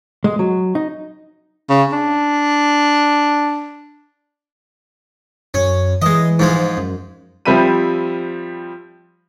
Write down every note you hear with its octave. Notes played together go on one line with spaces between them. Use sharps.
G#3
F#3
D#4
C#3
D4
F#2 C#4
E3 G#3 D#5
G#2 F3 G#3
F#2
F3 G3 C4 E5 B5 D#7